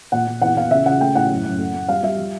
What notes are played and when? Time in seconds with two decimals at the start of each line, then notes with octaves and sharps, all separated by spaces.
0.12 A#2 F#5
0.27 A#2
0.42 E2 F#5
0.56 E2 F5
0.70 C#3 E5
0.86 C#3 F#5
1.01 A3 G5
1.15 A2 F#5
1.30 F#2
1.44 F#2
1.59 A3
1.74 A3
1.88 G3 F5
2.03 G3 E5
2.18 F3